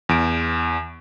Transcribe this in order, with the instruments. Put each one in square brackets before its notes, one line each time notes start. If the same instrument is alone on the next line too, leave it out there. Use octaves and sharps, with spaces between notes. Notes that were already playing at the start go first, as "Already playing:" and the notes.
[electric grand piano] E2 D7